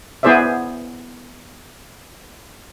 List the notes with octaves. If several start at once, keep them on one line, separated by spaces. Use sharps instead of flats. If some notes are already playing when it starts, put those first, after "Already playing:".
B3 E4 G#4 C5 D5 E5